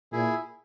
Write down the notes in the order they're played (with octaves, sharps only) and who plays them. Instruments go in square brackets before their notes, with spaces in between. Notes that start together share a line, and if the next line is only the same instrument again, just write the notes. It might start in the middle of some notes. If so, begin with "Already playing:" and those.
[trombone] A#2 [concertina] E4 G#4